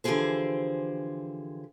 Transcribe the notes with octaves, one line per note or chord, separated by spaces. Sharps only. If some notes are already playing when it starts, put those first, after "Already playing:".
D3 E3 F3 G4 G#4 C5